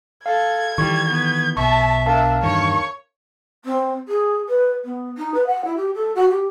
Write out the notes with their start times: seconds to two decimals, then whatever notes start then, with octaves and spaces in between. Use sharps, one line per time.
0.26 A4 F5 G#6
0.78 D#3 E3 G3 C#6
1.06 B3
1.57 B1 B2 E5 A5 C#6
2.06 D4 A#4 E5 F5 A5
2.43 E2 G2 D#3 C#5 C#6
3.65 C4
4.08 G#4
4.48 B4
4.84 B3
5.17 D#4
5.34 B4
5.46 F#5
5.64 E4
5.76 G4
5.94 A4
6.15 F#4
6.30 G4